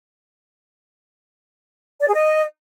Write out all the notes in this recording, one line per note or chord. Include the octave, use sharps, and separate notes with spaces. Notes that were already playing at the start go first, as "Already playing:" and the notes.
D5
G#4
D#5